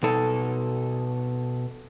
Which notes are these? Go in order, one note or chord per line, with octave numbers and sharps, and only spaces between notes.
B2 A4